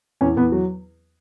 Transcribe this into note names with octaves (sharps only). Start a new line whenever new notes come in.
E2 C#4
E2 B3
F#3